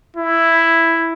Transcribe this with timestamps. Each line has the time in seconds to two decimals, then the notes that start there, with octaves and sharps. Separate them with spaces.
0.17 E4